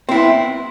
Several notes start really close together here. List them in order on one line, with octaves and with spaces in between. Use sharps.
C4 E4 B3